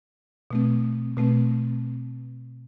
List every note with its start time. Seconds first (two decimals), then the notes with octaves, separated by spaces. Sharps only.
0.51 B2 A3 C4
1.17 B2 A3 C4